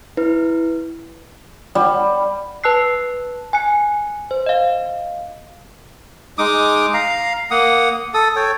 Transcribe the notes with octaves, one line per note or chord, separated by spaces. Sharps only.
E4 B4
G3
B4 A5 E6 F#6 C7
G#5 F#6 C#7
C5
D#5 F5
G#3 D#4 D6 D#6
F5 A#5
A#3 F#5 D#6
A4 D#6
A4 C#5 G5